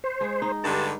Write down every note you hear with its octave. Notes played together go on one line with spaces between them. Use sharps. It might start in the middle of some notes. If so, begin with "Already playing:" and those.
C5
G#3 G#4
D#4
G2 D3 A5